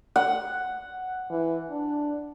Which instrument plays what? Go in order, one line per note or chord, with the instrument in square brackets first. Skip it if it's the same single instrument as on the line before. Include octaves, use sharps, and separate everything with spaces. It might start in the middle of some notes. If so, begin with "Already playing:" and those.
[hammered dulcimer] F#5
[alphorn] E3
D4